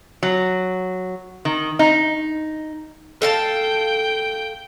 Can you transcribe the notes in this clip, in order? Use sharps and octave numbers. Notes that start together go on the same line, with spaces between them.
F#3
D#3
D#4
A4 F5 G5 A5